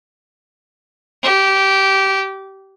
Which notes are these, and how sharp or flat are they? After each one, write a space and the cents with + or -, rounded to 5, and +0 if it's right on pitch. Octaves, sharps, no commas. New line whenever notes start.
G4 -20